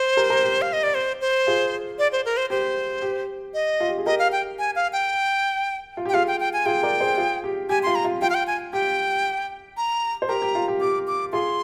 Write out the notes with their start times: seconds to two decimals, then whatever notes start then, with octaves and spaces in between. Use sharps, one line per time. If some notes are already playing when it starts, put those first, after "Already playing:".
Already playing: C5
0.17 G4 A#4
0.30 G4 A#4
0.43 G4
0.62 F5
0.73 D#5
0.83 D5
0.94 C5
1.21 C5
1.47 F4 G#4
1.99 D5
2.12 C5
2.25 A#4
2.37 C5
2.50 G4 C5
3.02 G4
3.54 D#5
3.80 F4
3.88 G4
3.98 G#4
4.06 G4 A#4 D#5
4.19 F5
4.32 G5
4.59 G#5
4.75 F5
4.93 G5
5.97 F4
6.05 G4
6.09 G5
6.14 F4 G#4 F5
6.27 G5
6.40 G5
6.53 G#5
6.66 F4 G#4 G5
6.83 A#4 D5
7.00 G#4 C5
7.18 F4 G#4
7.44 G4
7.69 G4 G#5
7.83 F4 C6
7.95 A#5
8.05 F4
8.22 F4 G5
8.30 F5
8.35 G5
8.47 G#5
8.73 G4 G5
9.77 A#5
10.22 C5
10.29 G4 A#4 A#5
10.42 G4
10.55 F4
10.68 G4
10.81 G4 D6
11.07 D6
11.33 F4 G#4 C6